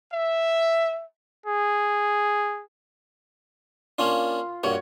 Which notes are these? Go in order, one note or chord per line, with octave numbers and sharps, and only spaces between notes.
E5
G#4
A#3 C#4 D4 F4
G2 A#3 F#4 C#5